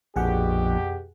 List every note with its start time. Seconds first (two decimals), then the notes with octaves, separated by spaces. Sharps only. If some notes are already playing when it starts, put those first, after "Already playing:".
0.16 A#1 F2 B2 G4 G#4 F#5